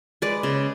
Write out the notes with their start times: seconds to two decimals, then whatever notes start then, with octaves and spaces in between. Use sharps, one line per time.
0.22 G#3 B4 D5
0.43 C#3